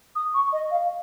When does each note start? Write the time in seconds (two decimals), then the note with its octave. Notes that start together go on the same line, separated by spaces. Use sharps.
0.16 D#6
0.34 C#6
0.52 D#5
0.71 F5